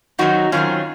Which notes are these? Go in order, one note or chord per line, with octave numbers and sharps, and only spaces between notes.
F#2 D#3 F#3 C4 D#4 F#4
F#2 D#3 F#3 C4 C#4 F4